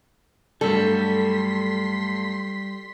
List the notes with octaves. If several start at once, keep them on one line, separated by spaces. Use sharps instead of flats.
G2 F#3 G3 A3 A4 C6 B6